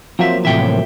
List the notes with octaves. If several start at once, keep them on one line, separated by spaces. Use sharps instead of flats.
F3 F#3 A#3 C4 E5
A2 C3 E3 E5 G5